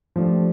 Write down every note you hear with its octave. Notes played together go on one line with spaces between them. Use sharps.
F3 A3 D4 G4